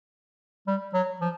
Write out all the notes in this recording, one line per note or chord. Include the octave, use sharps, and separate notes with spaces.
G3
F#3
F3